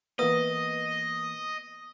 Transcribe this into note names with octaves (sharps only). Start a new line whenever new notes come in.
E3 A#3 B3 B4 D#5 D#6